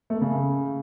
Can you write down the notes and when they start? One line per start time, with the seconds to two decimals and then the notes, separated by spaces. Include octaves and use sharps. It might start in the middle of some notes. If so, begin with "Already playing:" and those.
0.10 A3
0.16 A#3
0.21 C#3